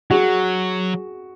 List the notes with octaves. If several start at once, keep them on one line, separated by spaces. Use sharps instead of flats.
F#3 F#4 G#4